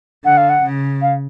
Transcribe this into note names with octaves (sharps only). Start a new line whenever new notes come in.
D3 F#5
F5
F#5
C#3
F5